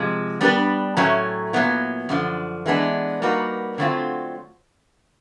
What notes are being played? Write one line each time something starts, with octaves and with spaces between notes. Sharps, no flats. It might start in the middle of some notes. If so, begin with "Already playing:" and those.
Already playing: C3 F3 G#3
G3 B3 D4 G4 B4
A2 F#3 A3 C#4
A#2 F#3 B3 E4
F#2 D3 F3
E3 G#3 B3 D4
G3 A#3 D#4 F#4 B4
D3 F#3 A3 C4 F4